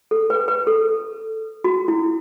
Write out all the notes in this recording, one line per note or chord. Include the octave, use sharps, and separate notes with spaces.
A4
B4
B4
A4
F#4
E4